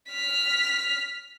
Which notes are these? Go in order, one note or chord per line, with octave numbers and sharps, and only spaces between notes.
F6 B6